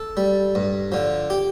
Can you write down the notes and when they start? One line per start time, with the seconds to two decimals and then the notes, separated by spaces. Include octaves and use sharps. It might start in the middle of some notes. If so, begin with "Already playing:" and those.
Already playing: A4
0.17 G3
0.55 G2
0.92 D3 F3
1.30 G4